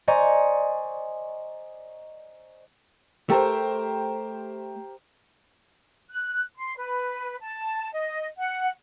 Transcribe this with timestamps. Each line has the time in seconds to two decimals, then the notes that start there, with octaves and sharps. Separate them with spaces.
0.08 C5 D5 D#5 G#5 A#5 C#6
3.30 A3 G4 A#4 C5
6.10 F#6
6.57 C6
6.77 B4
7.41 A5
7.93 D#5
8.37 F#5